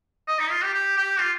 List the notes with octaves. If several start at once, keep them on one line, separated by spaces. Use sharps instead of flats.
D#5
D#4
F4
G4
G4
G4
F4